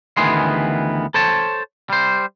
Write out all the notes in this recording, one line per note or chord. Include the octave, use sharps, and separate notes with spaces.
D2 D#3 E3 B3 G#4 C6
A4 C5 C#5 A5
G3 C5